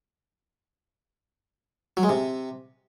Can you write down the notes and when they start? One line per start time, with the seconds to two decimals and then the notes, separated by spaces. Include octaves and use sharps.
1.97 F#3
2.03 G#3
2.09 C3